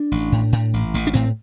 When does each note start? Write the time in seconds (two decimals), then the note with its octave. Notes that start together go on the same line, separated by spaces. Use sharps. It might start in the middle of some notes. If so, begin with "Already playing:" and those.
Already playing: D4
0.12 A1
0.32 A2
0.52 A2
0.74 A1
0.94 A1
1.07 D4
1.14 A2 C4